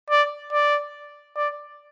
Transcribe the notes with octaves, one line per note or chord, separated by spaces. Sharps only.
D5
D5
D5